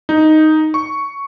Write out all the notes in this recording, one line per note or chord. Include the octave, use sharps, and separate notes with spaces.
D#4
C#6